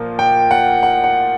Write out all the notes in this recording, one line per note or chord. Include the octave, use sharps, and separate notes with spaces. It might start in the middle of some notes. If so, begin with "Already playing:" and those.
Already playing: A#2 F3 A#3
G5
F#5
F#5
F#5